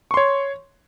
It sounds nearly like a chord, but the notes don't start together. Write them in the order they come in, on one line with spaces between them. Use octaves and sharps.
C#6 C6 C#5